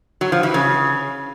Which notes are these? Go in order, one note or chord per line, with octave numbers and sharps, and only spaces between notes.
F#3
F3
E3
C#3